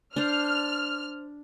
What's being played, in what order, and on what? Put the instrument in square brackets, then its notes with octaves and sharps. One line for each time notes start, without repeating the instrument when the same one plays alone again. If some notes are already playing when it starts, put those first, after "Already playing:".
[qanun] D4 C5 [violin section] F6